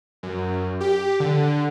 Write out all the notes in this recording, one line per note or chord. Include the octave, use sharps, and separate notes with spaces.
F#2
G4
D3